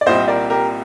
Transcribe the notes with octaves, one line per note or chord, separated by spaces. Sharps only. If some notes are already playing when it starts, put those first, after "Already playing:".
D5
C2 A#2 G3 C4 C5 D#5
A#4 D5
G4 A#4